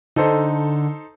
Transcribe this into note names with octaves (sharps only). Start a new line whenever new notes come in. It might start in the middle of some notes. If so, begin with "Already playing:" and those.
D3 D#4 A4 C5